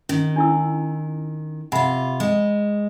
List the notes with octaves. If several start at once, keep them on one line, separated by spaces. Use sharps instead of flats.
D#3 C#4
D4 E4 E6
C3 F4 F#5 B5
G#3